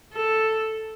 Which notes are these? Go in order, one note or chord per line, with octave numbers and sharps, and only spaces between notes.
A4